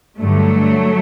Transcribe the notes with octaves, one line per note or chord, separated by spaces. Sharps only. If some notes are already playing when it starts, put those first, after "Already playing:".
G2 D3 F#3 A3